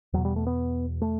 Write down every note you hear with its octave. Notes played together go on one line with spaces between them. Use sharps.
E2 B2 F#3
G3
A3
B3
A3